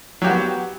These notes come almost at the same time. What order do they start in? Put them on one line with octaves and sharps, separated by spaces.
F#3 G4 F#4 B3